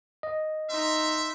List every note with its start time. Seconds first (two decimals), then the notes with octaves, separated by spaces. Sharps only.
0.23 D#5
0.70 D#4 E5 C6